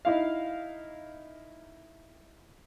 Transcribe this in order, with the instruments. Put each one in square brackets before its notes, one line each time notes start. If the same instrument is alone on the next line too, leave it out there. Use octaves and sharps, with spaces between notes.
[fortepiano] D#4 E4 F5